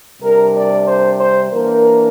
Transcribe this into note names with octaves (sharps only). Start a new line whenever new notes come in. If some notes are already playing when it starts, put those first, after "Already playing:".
C3 G3 D4 A#4
D5
C5
C5
E3 A#3 D4 A#4